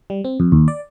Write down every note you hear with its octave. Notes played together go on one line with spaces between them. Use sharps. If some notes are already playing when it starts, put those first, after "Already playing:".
G3
C4
F2
D#2
D5